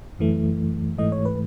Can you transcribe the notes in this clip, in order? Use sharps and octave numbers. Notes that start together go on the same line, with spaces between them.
F#2 E3 A3
G#2 E3 A3 D#5
C#5
B4